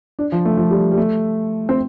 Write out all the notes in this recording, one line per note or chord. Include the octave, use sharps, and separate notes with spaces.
D4
F3
A3
F3
G3
G3
A3
C4